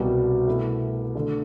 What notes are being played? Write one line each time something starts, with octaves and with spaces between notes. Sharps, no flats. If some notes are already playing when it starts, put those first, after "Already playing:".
Already playing: C2 B2 G3
B2 A3 E4
D3 A3 D4